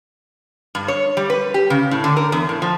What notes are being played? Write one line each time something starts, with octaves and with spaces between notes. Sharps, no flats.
G2
C#5
G3
B4
G4
C#3
A2
D3
A#4
E2
A2
F3